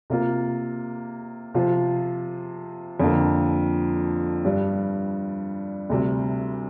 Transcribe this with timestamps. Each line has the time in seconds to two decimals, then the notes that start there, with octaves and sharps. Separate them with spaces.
0.10 C3 A#3 F4
1.54 C3 F3 C4 F4
3.00 F2 D3 F3 A#3
4.45 G2 G3 D4
5.89 D2 C3 G3